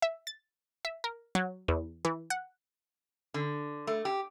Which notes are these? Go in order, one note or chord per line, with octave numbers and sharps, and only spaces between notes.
E5
A6
E5
A#4
F#3
E2
E3
F#5
D3
A3
G4